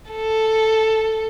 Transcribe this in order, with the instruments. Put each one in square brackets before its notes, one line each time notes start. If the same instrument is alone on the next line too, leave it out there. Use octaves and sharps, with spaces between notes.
[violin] A4